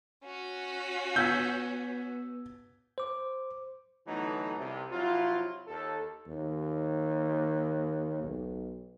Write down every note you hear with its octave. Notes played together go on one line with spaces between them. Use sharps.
C#4 F#4
B3 E6 G6 G#6 B6
C5 D6
D3 E3 F#3 A3 B3 D#4
C2 C3
C3 F3 F#3 E4 F4
D#2 A4
D#2
B1